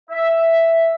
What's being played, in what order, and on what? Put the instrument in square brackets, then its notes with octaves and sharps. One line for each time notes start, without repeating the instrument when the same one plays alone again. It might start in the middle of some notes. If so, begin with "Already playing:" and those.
[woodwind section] E5